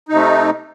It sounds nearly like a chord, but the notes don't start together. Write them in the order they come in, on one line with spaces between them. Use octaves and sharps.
D#4 C3 A3